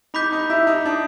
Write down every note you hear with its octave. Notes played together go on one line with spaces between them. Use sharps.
D#4 B5 D6 G6 B6
D#4
E4
D#4
D4